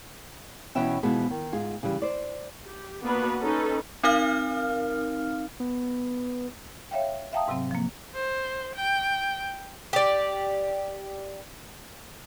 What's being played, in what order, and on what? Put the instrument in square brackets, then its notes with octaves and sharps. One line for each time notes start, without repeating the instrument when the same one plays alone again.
[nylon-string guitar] B2 E3 C#4 B4 E5 G5
B2 E3 F3 G#3 B3 G#4
D#3
G#2 F4 G#4
C#3 E3 G3
C5 D5
[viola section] G4
A#3 B3 D4 F#4 B4
C#4 D#4 A4 B4
[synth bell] C4 D#4 A#4 F5 F6
[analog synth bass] B3
[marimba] C#5 E5 F5 G5
E5 F5 G5 A5 A#5 D#6
G#2 C3 F#3 C4
F3 A#3
[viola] C5
G5
[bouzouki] G4 D5